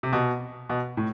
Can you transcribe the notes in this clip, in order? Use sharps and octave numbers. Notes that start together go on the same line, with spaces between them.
C3
B2
B2
A2